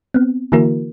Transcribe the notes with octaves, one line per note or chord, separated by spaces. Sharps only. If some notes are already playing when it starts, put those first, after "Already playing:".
B3 C4
D3 E3 A#3 E4 F#4 A#4